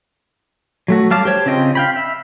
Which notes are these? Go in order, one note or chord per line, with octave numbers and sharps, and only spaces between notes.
F#3 A3 F#4
F#3 G3 F5 A5 D6
G4 C5 C#5 A5
C#3 C4 F4 D#5 G5
F5 G5 B5
E5